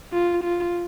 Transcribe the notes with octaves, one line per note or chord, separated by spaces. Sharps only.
F4
F4